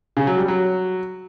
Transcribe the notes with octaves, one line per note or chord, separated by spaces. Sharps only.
C#3
F#3
G3
F#3